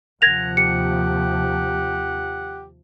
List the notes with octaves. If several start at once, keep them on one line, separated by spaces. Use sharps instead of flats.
D#2 C3 F3 F#5 G#6 A#6 F7
G4 C#7